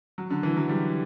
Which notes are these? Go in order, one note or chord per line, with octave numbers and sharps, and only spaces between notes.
F#3
D3
E3
F#3
G3